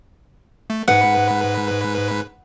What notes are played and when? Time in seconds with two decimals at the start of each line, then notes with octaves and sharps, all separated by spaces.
0.70 A3
0.88 G#2 B4 F#5